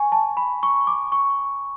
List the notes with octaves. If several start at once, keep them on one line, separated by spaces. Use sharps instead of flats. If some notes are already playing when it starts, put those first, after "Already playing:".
Already playing: G#5 C#6
A5
B5
C#6
D6
C#6